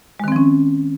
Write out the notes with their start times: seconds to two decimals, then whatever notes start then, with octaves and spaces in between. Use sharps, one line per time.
0.20 G#3
0.24 D#3
0.28 C4
0.32 F3
0.36 C#4